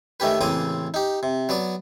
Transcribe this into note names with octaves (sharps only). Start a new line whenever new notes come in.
D#3 A3 C#4 G4 B4
A1 C#3 A#3 C4 D6 D#6
D#4 G4
C3
F#3 B3 D5